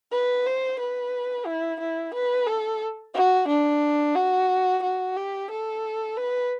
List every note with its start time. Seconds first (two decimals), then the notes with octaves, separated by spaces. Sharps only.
0.12 B4
0.47 C5
0.79 B4
1.46 E4
1.80 E4
2.14 B4
2.47 A4
3.15 F#4
3.48 D4
4.16 F#4
4.83 F#4
5.17 G4
5.51 A4
6.17 B4